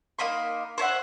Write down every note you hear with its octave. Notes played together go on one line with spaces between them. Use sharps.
A#3 D#4 B5 C6
C5 C#5 E5 F#5